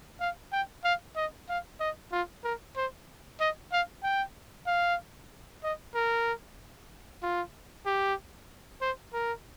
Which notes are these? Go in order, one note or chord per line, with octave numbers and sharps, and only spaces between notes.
F5
G5
F5
D#5
F5
D#5
F4
A#4
C5
D#5
F5
G5
F5
D#5
A#4
F4
G4
C5
A#4